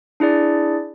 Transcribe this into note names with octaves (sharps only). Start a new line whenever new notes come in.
D4 E4 G#4 D5